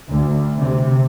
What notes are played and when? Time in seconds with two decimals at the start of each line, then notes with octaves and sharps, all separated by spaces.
0.10 D2
0.56 C3